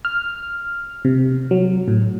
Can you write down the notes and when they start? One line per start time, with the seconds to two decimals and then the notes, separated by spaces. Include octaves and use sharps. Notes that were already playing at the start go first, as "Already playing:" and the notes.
0.05 F6
1.05 C3
1.51 F#3
1.88 A2